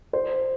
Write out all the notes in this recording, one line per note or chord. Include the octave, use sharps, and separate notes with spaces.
C5